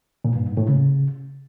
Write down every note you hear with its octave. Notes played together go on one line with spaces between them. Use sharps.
A#2
G2
G#2
A2
C#3